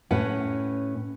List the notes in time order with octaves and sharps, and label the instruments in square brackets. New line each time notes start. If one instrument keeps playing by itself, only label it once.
[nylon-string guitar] A2 C#4 B4 F#5